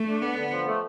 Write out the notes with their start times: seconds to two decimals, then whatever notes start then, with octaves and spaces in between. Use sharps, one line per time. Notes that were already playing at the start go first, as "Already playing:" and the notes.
Already playing: A3
0.08 D4
0.22 D3 B3
0.38 D3
0.53 F3
0.67 A3